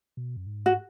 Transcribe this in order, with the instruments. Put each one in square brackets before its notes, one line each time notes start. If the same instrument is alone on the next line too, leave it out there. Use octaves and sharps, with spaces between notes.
[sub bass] B2
F#2
G#2
[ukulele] F#4